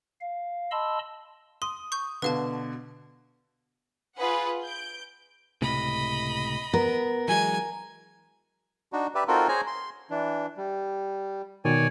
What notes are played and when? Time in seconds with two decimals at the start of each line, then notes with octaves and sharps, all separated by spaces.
0.21 F5
0.71 D#5 A5 B5 C6 E6
1.62 C6 D#6
1.92 C#6 G6
2.22 B2 D3 B4 F5 A5
4.16 F4 G#4 B4 F#5
4.64 G6 D7
5.62 C#2 A2 C3 D#5 B5
6.74 B3 A#4
7.28 E3 F#3 G#3 G#5
8.93 D4 D#4 F#4
9.15 G4 B4 D5 E5
9.28 C4 D#4 F4 F#4 A4 A#4
9.48 G#4 C5 C#5 G#5 A#5
9.67 C6
10.10 E3 D4
10.57 G3
11.65 B2 D#3 C#5 D5 G#5